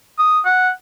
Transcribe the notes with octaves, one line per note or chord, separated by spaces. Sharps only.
D#6
F#5